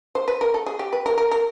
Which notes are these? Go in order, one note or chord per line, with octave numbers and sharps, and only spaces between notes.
C5
B4
A#4
A4
G#4
G4
B4
A#4
A#4
A#4